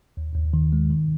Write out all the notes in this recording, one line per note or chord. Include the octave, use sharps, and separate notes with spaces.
D#2
D#2
D#3
G#3
D#3